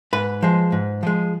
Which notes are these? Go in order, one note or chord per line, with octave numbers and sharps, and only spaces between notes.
G#2 B4
F3 G#3
G#2
F3 G#3